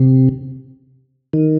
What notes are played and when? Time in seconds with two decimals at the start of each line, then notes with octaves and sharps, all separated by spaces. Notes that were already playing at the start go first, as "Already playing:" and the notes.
Already playing: C3
1.33 D#3